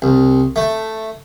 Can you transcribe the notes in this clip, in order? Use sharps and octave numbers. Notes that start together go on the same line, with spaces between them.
C2
A3